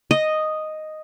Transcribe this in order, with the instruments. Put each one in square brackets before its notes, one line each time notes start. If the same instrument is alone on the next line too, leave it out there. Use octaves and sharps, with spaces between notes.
[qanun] D#5